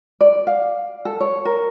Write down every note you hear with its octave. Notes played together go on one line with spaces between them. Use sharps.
D5
F5
A4
C#5
A#4